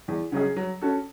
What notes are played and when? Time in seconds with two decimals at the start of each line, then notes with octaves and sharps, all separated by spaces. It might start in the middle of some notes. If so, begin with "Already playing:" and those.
0.08 E2
0.32 C#3 F#3 C#4 G#4
0.56 F#3
0.81 C#4 F#4 A4